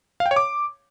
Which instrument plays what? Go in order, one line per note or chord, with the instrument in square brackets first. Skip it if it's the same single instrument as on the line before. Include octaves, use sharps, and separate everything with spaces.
[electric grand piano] F5
G5
C#5
D6